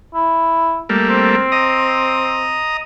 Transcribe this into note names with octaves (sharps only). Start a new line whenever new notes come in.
E4
G3 A3 A#3
C4
D#5 A#5 D#6